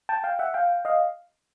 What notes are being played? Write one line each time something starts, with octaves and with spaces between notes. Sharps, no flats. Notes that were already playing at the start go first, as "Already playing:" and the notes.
G5 A5
F5 G5
E5 F#5
F5 G5
D#5 F5